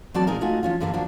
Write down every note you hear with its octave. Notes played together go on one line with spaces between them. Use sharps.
F#3 C4 F#4 D5 A5
A#2 G#3 D#4 G#4 A#4
A3 D#4 F4 F#4 G#5
F3 C#4 F4
G2 D3 G3 A#3 B3 D4
F3 A#3 D4 F#4